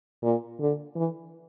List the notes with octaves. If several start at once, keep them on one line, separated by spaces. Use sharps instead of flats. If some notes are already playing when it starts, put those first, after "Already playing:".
A#2
D3
E3